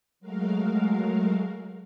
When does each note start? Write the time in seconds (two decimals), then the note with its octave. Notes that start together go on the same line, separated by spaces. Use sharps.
0.20 F#3 G#3 A3 F#4 A#4 F5